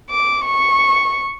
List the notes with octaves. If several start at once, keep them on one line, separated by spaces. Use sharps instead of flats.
D6
C#6